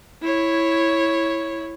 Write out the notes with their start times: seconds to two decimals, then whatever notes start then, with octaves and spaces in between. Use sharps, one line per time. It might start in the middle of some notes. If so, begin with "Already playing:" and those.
0.22 E4 C#5